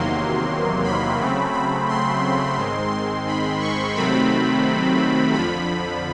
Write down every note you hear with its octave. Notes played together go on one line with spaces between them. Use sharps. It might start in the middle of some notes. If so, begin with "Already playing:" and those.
Already playing: E2 C3 D#3 F#3 A#3 C6
B5
C#3 F#3 A3 C4
B5
C6
G#2 D#3 G#3 C4
C6
B5
C#6
C3 D#3 F#3 A3 C4 B5
F2 D3 F3 B5